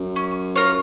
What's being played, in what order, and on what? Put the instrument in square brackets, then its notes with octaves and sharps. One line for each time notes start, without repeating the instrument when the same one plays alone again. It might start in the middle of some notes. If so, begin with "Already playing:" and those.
Already playing: [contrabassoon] F#2
[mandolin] C#4
F4 A#4 C#5